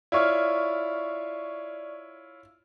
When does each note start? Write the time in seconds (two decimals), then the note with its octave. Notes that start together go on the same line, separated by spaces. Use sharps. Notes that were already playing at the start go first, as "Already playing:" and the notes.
0.12 E4 F4 C#5 D5 C#6 F6